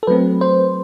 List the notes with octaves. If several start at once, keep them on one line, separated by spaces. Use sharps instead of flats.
A4
F#3 A3 C4 B4
C5